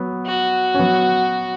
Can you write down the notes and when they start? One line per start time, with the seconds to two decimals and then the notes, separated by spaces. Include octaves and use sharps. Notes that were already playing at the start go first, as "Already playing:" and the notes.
Already playing: F#3 B3
0.26 F#4
0.74 C#4
0.79 F#3 B3